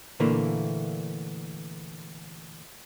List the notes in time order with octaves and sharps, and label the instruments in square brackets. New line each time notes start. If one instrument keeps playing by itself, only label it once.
[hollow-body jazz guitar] A#2 D3 E3 A3 A#3